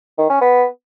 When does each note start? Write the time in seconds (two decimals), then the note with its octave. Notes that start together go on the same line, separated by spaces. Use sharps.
0.18 D#3
0.30 C#4
0.42 B3